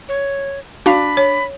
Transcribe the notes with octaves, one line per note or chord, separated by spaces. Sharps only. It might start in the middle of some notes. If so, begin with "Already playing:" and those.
C#5
D4 F#4 F5 B5
C#5